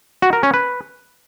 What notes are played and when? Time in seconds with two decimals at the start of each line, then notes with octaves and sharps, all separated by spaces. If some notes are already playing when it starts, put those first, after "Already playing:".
0.22 F#4
0.33 A#4
0.43 C#4
0.54 B4